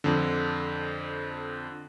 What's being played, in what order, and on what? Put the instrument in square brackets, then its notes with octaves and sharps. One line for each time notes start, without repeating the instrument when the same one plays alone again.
[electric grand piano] F2 D3